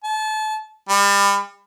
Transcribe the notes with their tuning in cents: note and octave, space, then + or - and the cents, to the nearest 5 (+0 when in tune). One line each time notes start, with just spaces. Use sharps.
A5 -30
G3 +35